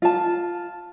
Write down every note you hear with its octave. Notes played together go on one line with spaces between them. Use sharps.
F4 A5